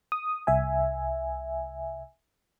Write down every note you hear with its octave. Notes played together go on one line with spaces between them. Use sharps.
D#6
C2 E5 G#5